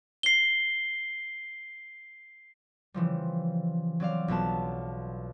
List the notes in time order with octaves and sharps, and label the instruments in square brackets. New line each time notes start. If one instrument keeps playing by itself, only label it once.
[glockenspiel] C7 G7
[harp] C#3 E3 F3 G3
F#3 C4 D5 F5
B1 B2 B3 F4 A5